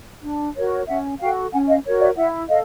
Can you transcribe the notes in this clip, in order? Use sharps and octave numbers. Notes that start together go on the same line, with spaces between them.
D4
F#4 A#4 C#5
C#4 E5 F#5
F#4 A4 F5 G5
C#4 F#5 G#5
D#5 F5
F#4 A#4 C#5
D5 E5
E4 E5 F#5
A4 D#5 F5